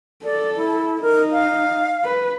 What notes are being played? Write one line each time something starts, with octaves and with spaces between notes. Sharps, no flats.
A4 D5
E4
D#4 A#4
F5
B4